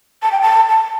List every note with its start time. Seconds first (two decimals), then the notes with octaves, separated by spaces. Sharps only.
0.23 A5
0.32 G5
0.41 A5
0.69 A5